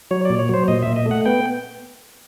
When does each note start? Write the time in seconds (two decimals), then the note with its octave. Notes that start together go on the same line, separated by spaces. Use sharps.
0.11 F#3 C#5
0.25 A#2 D5
0.39 C#5
0.49 F#3 C5
0.68 A#2 D#5
0.82 A#2 E5
0.96 D#5
1.06 A3
1.11 F#5
1.26 B3 G5